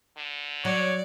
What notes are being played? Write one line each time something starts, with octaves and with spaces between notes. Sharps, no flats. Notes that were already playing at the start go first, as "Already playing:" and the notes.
D3
F#3 C#5 D5